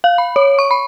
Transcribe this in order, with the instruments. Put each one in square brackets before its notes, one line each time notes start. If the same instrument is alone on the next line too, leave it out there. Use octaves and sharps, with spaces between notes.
[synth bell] F5
B5
C#5
C#6
B5